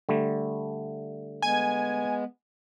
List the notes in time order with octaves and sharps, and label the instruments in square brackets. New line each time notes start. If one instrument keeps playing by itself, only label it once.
[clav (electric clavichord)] D3 G3 A3
[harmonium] G#3 B3 [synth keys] G#5